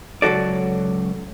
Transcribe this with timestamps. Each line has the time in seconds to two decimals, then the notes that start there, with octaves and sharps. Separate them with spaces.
0.22 C#2 F#3 F#4 A4 D5